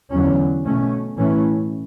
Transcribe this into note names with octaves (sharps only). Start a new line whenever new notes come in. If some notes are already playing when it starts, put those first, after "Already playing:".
E2 D3 F#3 C#4
B2 A3 C#4
A2 E3 A3 C#4